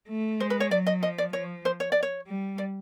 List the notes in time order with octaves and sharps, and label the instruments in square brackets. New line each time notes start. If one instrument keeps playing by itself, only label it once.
[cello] A3
[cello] G#3 [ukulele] C5
[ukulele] B4
C#5
[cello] F#3 [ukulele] D5
[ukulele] D#5
[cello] F3 [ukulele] D#5
[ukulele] D5
[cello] F3 [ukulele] C#5
[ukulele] C5
C#5
D5
C#5
[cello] G3
[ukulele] D5